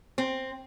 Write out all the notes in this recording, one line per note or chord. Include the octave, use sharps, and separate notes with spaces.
C4